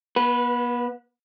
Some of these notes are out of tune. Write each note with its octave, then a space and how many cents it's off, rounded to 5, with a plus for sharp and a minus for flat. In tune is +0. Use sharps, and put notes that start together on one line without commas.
B3 -40 B4 -5